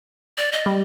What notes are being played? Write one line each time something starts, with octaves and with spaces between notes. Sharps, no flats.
D5
D#5
G3